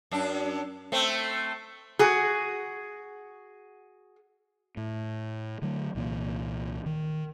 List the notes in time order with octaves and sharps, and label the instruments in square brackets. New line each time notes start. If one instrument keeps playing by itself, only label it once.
[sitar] F#2 D4
A3 C4
[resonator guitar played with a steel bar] F#4 G#4
[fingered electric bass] A2
D3 F#3 A3
C2 A#2 E3 A#3
D#3